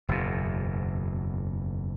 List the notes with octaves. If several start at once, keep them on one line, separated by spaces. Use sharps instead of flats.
F#1 E2 B2